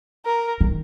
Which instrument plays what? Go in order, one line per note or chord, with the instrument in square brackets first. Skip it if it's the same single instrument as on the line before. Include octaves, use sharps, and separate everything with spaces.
[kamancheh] A#4
[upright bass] D#3